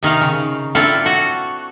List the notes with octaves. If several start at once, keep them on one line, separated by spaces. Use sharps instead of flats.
C3 D#3 D#4 F5
C#3
C4 D4 E4 F4 A4
F#4